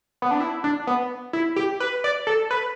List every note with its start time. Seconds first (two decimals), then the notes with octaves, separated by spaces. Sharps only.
0.22 B3
0.31 D4
0.40 E4
0.64 D4
0.87 B3
1.33 E4
1.56 G4
1.80 B4
2.04 D5
2.27 A4
2.51 B4